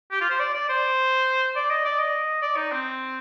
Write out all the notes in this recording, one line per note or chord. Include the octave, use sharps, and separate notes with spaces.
G4
F4
C5
D5
D5
C5
D5
D#5
D5
D#5
D5
D#4
C4